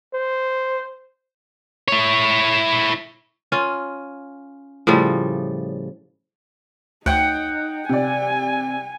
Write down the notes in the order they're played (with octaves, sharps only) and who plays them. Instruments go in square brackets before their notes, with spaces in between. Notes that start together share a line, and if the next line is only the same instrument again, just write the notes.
[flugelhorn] C5
[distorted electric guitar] E4 C#5
[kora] C#4 F4
A2 C#3 F3 G3
[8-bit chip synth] D2 [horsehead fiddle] D#4 [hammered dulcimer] F#5 G5
[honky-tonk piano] C3 D5 [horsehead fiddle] G#5